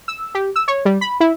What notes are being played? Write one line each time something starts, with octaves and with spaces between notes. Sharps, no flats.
E6
G4
E6
C#5
G3
B5
E4